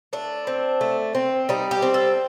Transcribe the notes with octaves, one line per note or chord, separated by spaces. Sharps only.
A3 D4
C4
A3
C4
G3 D#4
G4
C4
A4